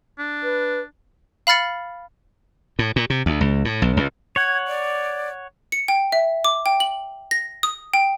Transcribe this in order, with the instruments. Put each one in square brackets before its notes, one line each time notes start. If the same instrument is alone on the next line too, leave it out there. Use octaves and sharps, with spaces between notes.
[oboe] D4
[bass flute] B4
[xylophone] F5 B5 F6 A6 C#7
[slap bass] A2
A#2
C3
D2
C#2
A2
B1
C#2
[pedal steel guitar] C#5 F#5 [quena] G#6
[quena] D5
[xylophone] C#7
G5
E5
D6
G5
F#7
A#6
D#6
G5